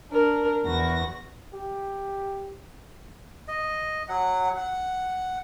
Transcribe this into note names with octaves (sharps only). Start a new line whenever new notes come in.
D4 A#4
E2 F#4 A#6
G4
D#5
F#3 F#5
F#5